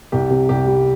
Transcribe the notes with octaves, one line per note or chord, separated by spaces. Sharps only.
C2 G4
C3
C2 G4
G3